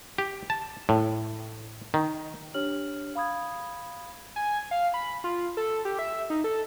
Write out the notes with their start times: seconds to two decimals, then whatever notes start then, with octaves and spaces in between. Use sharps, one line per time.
0.18 G4
0.50 A5
0.89 A2
1.94 D#3
2.54 D4 G4 C#5 F6 F#7
3.15 F5 B5 D#6 G#6
4.36 G#5
4.71 F5
4.94 B5
5.24 F4
5.57 A4
5.85 G4
5.99 E5
6.30 D#4
6.44 A4